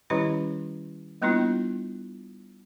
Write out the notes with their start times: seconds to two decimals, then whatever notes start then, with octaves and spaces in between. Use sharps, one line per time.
0.10 D#3 G3 C#4 E4 G4 C#5
1.22 G3 A#3 B3 D4 E4 F4